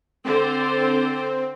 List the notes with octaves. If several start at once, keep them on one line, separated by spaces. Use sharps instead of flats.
D3 C4 C5